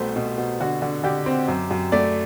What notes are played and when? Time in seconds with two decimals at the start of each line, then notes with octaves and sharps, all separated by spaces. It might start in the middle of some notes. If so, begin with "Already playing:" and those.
Already playing: C2 B2 A3 C5
0.16 B2
0.38 B2
0.60 D3 F#4
0.82 D3
1.04 D3 G4
1.26 C4
1.48 F#2
1.71 F#2
1.92 A3 D5